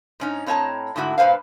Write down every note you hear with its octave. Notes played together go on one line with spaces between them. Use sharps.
G#2 C#4 D#4
A2 C4 C#5 D#5 A5 A#5
G#2 D3 A3 E4 F#4
G2 A#2 B4 C5 F5